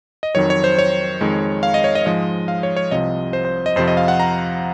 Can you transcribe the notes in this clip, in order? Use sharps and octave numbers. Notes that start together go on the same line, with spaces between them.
D#5
F2 D#3 F#3 C#5
C#5
C5
C#5
F2 D#3 G#3
F5
D#5
C#5
D#5
G#2 F3 G#3 D#5
F5
C#5
C#5
C2 C3 F3 D#5
C5
C5
D#5
F2 C3 F3 C5
D#5
F5
F#5
A#5